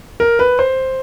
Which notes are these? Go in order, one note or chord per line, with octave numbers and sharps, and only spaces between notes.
A#4
B4
C5